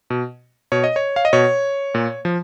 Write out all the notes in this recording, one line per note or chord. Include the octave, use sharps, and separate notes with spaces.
B2
B2 C#5
D#5
C#5
F5
D#5
B2 C#5
A#2
F3